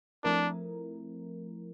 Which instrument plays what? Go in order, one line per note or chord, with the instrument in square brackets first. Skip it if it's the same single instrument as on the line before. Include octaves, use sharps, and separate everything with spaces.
[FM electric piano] F3 A3 C4 E4 A#4 [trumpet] D4